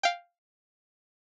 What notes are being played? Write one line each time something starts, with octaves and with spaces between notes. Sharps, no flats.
F5 G5